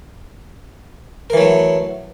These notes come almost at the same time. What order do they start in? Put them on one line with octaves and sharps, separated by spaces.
A#4 E3 F#3 A3